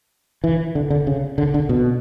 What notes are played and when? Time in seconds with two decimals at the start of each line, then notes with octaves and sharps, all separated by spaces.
0.44 E3
0.75 D3
0.90 D3
1.07 C#3
1.38 D3
1.54 D3
1.69 B2